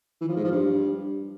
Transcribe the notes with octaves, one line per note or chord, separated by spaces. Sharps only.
E3
F3
G#2
F3
G2